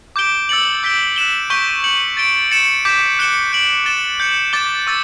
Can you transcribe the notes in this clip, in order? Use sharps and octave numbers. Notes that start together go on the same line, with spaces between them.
D6 G6 D7 G7
E6 A6 C#7 F#7
D6 G6 B6 D7 G7
F#6 B6 E7 G7
C#6 G6 B6 D7 G7
G6 C#7 F#7
A6 D7 G7
A6 C#7 E7
D6 G6 B6 E7
F#6 C#7 E7 G7
G6 D7 F#7
A6 E7 G7
G6 C#7 F#7
D6 A6 E7 G7
C#6 E6 A6